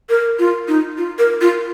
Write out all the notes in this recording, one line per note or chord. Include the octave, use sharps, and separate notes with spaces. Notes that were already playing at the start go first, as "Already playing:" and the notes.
A#4
F4
D#4
F4
A#4
F4